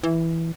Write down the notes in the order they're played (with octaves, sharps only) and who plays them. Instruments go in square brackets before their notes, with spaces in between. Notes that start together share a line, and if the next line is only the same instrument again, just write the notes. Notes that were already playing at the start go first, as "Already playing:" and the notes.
[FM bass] E3